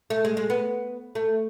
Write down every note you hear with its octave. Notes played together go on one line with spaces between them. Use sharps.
A3
G#3
G#3
B3
A3